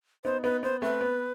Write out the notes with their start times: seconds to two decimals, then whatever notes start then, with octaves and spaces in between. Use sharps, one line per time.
0.24 B3 D#4 C5
0.44 B3 D#4 B4
0.63 B3 C5
0.82 A3 C4 B4
1.01 B3